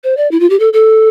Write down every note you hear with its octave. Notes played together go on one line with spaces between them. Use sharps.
C5
D5
E4
F4
G4
A4
A4